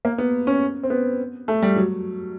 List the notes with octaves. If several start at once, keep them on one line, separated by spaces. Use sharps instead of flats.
A#3
B3
C#4
C4
B3
A3
G3
F#3